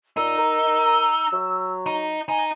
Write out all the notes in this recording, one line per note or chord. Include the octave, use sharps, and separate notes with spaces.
A#2 D#4 E6
A#4
F#3
D#4
D#4 G#5